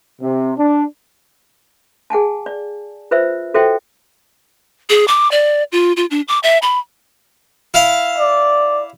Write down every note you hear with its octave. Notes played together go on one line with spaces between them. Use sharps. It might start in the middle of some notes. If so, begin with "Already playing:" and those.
C3
D4
G#4 F#5 G#5 A5
D5
F4 B4 C5 E5 E6
F#4 A4 C5 E5 F#5 G5
G#4
D6
D5
F4
F4
D4
D6
E5
B5
E4 F5
D5